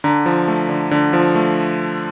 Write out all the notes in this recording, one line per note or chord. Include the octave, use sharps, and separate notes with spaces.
D3 A#5
F3
A3
D3
D3
F3
A3